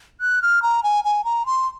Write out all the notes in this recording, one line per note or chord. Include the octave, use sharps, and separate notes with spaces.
F#6
F6
A#5
G#5
G#5
A#5
C6